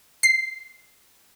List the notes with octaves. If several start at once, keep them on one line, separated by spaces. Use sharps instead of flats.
C7